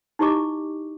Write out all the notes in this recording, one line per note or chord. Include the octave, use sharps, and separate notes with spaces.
D#4 E4 G4 D#5 C#6 D6